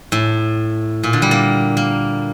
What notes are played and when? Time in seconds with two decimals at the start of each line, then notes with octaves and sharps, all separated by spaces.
0.12 A2
1.03 A#2
1.13 D3
1.22 G3
1.31 A#3
1.77 A#3